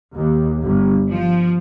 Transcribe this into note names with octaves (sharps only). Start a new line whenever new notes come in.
D#2
G1
F3